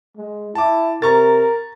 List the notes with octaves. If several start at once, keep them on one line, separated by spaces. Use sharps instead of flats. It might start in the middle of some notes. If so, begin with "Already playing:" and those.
G#3
E4 A5 D6
C3 A#4 A#5 C#6 A6